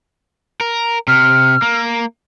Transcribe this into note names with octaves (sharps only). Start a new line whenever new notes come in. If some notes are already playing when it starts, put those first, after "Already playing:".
A#4
C3 F6
A#3